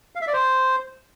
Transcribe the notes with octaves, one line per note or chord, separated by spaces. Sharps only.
F5
E5
D5
C5